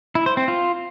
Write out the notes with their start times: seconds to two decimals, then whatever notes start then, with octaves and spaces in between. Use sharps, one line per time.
0.15 E4
0.26 C5
0.37 C4
0.48 F4